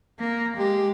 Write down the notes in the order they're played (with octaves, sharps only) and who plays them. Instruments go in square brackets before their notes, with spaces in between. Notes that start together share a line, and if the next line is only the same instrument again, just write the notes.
[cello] A#3
[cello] G#3 [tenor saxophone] G4